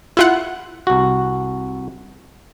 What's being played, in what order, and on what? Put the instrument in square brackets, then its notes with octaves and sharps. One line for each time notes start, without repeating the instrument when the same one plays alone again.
[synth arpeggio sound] E4 F4 F#5
[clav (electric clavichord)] C2 F#4